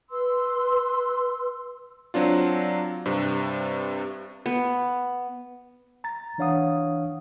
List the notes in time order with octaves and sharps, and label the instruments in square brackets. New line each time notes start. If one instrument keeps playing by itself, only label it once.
[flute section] B4 C6 E6
[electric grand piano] F#3 C4 D4 F4
G2 C3
[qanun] B3
[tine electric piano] A#5 A6
E3 D4 C#5 F5 F#5 D#6